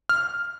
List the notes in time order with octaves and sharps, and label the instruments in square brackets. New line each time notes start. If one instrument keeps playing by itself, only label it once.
[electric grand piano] F6